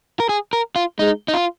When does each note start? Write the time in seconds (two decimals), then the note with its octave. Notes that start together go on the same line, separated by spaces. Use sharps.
0.20 A#4
0.29 G#4
0.53 A#4
0.76 F4
0.99 G#3 D#4
1.28 D#4
1.34 F4